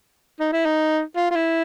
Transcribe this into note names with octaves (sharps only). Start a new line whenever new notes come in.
D#4
E4
D#4
F4
F4
E4